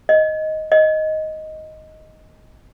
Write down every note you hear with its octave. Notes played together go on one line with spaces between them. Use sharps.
D#5
D#5